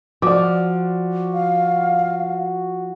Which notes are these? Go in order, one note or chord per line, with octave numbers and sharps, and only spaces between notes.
F3 F#4 D5 D6
F5